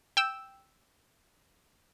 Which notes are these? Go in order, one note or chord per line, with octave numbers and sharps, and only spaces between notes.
G5 E6